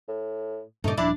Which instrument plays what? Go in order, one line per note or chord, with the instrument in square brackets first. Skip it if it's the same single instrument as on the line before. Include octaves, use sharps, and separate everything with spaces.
[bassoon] A2
[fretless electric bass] G2 A#2 C#3 [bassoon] A3 [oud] D#4 D5
[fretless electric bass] D#1 F3 [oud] D4 [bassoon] E4